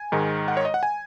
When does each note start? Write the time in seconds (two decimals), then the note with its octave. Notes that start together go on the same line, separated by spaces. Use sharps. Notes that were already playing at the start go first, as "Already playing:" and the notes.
Already playing: G#5
0.12 G#2 D#3 G#3
0.48 F#5
0.57 C#5
0.65 D#5
0.74 F#5
0.83 G#5